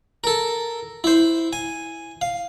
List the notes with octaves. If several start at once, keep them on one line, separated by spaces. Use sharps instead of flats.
A4 A#4
E4 C5
G#5
F5